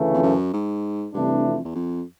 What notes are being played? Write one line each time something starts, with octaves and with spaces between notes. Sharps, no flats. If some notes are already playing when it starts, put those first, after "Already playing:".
Already playing: D2 C#3 E3 A3
F2
F#2
G#2
G2 C3 E3 A3 D4
F2
E2
F2